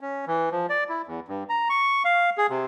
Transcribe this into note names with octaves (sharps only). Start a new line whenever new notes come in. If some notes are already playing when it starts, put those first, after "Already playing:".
C#4
E3
F3
D5
E4
E2
G2
A#5
C#6
F5
G#4
C3